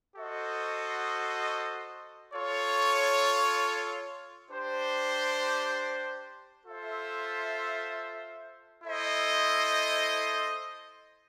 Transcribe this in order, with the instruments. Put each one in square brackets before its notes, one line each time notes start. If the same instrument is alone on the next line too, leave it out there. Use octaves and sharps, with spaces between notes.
[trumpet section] F#4 A4 C5 D#5
F4 A4 C#5
D4 G4 C5
F4 A4 C5 E5
E4 A4 C5 D#5